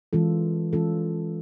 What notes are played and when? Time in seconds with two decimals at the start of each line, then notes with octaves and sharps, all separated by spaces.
0.13 E3 G#3 C#4 F4 A4
0.73 E3 G#3 C#4 F4 A4